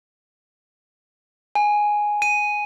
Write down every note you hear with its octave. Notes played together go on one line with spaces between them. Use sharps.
G#5
D#7